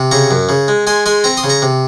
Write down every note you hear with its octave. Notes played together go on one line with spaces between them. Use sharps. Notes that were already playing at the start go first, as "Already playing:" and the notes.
Already playing: C3
C#3 A#5 C#6
F#2
C#3
G#3
G#3 G#5 C6
G#3 G#5 C6
C4 A#5 C#6
C6 D#6
C#3
A#5 C#6
C3